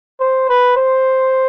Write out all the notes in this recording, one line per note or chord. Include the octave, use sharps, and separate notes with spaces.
C5
B4
C5